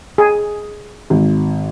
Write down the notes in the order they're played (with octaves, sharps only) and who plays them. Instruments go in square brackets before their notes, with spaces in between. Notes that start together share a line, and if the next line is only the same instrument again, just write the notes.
[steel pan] G#4
[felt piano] G#1